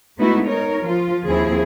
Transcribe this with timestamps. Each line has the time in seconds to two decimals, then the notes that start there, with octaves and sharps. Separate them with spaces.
0.18 G#3 A3 B3 D#4 E4 F#4
0.46 D#4 A#4 C#5
0.84 F3 F4
1.26 D#2 F3 C4 E4 G#4